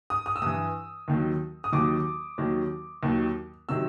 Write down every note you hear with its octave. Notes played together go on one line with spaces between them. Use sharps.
D#6
D#6
E6
G2 E3 D#6
D#2 D#3 F#3
D#6
D#2 D#3 F#3 D6
D#2 D#3 F#3
D#2 D#3 F#3
C3 D#3 F#3 E6